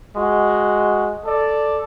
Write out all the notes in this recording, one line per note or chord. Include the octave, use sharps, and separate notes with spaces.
G#3 F#4
A4 D5